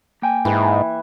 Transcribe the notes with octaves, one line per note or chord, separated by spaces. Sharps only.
A#3 G5 G#5
G#2 E3